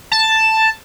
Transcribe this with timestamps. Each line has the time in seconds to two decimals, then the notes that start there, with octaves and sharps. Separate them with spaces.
0.12 A5